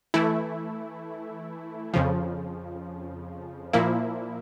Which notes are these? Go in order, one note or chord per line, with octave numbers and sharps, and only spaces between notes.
E3 A3 E4
F2 C#3 F3
A#2 F3 A#3 E4